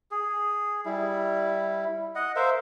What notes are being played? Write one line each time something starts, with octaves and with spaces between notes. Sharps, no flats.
G#4
G3 E4
D#5 F#5
A#4 C5 E5 F5